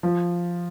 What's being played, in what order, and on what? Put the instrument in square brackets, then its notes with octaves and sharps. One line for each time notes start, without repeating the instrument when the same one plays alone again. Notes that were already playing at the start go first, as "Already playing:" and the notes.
[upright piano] F3